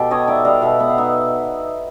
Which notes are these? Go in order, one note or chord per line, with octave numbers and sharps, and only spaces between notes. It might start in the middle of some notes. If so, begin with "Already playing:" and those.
Already playing: B2 G4 A4
B3 C#5 D#5
D#4 D5 E5
G3 D#5 F5
B2 E5 F#5
B3 F#5
F5
D#4 E5 F#5